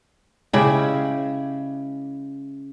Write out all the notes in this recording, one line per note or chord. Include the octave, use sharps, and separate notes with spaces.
C#3 G#3 E4 G4